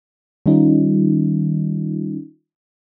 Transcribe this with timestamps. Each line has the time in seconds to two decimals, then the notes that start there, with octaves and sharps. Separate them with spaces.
0.46 D#3 G3 C#4 D#4 F4